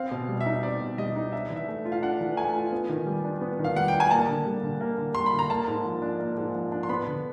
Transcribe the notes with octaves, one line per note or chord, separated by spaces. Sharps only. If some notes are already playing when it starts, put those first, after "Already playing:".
Already playing: C4 F5
B2
G3
E5
D#4
C4 D5
B2
G3 D#5
D#4
D4 E5
E3
E5
A3
F4
F5
D4 F#5
E3
A3 G#5
F4
B3
D#3
G3
D4
B3
D#3
F5
G3 F#5
G5
D4
G#5
A#3 A5
D3
G3
D3
A#3
D3
G3 C6
B5
D3
A#5
A#3 A5
G#2
F3
D4
A#3
G#2
F3
D4
C6
B3 B5
D3